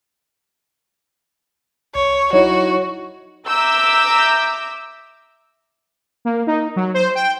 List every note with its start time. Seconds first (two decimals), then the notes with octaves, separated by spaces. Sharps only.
1.95 C2 C#5
2.33 F#3 D#4 E4 F#4 C#5
3.47 E5 A#5 D6 E6 G6
6.25 A#3
6.47 D#4
6.76 F#3
6.94 C5
7.15 G5